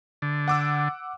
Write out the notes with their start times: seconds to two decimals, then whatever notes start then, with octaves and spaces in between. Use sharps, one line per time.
0.22 D3
0.48 F#5 D6 E6